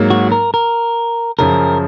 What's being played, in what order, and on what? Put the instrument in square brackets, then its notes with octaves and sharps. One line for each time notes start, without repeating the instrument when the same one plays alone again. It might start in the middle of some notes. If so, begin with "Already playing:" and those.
Already playing: [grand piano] G#2 F#3 A#3
[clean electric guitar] F#4
A#4
A#4
[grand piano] F#2 C#3 F3 [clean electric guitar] A#4